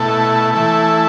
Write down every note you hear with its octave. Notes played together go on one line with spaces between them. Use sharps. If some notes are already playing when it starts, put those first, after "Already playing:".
Already playing: B2 A3 E4 A4
E3 A3 E4 A4